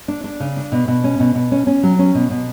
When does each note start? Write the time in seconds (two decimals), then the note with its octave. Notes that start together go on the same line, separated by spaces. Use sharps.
0.08 D4
0.24 D4
0.40 C#3
0.57 D4
0.72 B2
0.88 B2
1.04 C#4
1.20 B2
1.35 B2
1.52 C#4
1.67 C#4
1.83 F#3
1.99 C#4
2.15 B2
2.31 B2